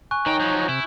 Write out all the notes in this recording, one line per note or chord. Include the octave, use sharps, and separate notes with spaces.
G#5 C#6 F#6
D#3 D#4 C#5 G5 A#5
F3 F#3 G6
C3 E4